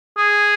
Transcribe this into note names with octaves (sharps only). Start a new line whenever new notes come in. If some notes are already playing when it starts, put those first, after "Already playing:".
G#4